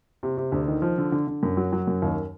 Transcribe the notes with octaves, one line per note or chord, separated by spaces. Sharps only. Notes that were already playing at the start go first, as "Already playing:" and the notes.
C3
C3
D2
D#3
F3
D3
D3
D3
F#2
F#3
F#3
F#2
D#2